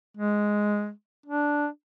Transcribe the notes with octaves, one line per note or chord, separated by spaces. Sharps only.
G#3
D4